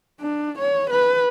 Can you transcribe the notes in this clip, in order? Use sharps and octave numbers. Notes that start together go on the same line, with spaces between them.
D4
C#5
B4